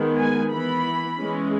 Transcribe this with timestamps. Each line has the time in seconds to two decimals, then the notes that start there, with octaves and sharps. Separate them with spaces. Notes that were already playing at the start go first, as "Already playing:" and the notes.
Already playing: D#3 G#3 B3
0.19 G#5
0.53 E3 B3 B5
1.19 E3 G#3 C#4